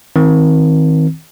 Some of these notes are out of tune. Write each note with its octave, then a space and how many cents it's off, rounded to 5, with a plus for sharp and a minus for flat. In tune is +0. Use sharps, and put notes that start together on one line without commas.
D#3 +30 C4 +0